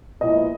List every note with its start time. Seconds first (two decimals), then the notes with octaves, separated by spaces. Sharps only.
0.21 A#2 F3 G#3 B3 E4 D#5